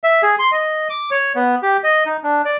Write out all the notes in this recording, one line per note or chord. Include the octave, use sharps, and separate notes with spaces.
E5
G#4
C6
D#5
D6
C#5
B3
G4
D#5
D#4
D4
D5